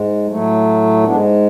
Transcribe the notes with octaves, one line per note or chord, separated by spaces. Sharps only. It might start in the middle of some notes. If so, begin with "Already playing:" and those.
Already playing: G#2 G#3
A2 F#3 A3
G#2 G#3 B3 D4